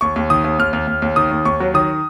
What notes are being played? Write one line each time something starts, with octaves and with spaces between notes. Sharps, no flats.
D#2 C#6
D#2
D#3 D#6
D#2
D#2 F6
D#2
D#2
D#2
D#3 D#6
D#2
D#2 C#6
F#3
D#3 D#6